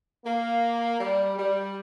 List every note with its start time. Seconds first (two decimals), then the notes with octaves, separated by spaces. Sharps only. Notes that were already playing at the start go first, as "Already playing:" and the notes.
0.25 A#3
0.99 G3
1.38 G3